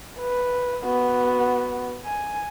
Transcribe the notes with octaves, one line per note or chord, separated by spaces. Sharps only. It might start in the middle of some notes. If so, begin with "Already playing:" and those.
B4
B3 F#4
G#5